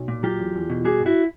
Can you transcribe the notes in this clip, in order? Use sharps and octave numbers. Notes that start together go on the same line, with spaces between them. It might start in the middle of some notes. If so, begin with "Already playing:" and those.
Already playing: B1
A#2
F#3 F4 G4
E2
E2
B2
G3 F#4 G#4
G2
E4 F#4